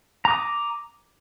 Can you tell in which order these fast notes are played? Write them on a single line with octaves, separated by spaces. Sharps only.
A#5 D6 D#6